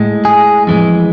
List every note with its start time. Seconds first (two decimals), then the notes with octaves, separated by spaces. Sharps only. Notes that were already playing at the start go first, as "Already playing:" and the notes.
Already playing: A2 G#3
0.25 G#4
0.67 F2 E3 G#3